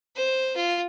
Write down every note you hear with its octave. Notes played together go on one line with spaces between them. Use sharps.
C5
F4